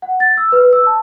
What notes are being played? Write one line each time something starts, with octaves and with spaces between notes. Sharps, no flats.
F#5
A6
E6
B4
E6
A5